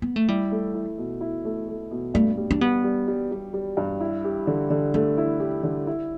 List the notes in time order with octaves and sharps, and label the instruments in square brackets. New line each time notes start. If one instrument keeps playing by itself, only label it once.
[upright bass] B3
A3
[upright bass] G3 [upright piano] E4
[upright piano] A3
E4
B2
E4
A3
A3
B2
[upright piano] G2 [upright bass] A3
[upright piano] G3
[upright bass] D4
[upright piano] G3 [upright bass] B3
[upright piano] G3
G3
G3
G3
G2
E4
G4
D3
D3
[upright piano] A3 [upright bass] D4
[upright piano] E4
G4
D3
E4